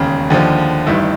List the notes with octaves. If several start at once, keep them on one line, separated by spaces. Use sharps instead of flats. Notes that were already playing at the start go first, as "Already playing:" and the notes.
Already playing: E1 D#2 C#3
D#2 D3 F3
A1 G2 D#3 E4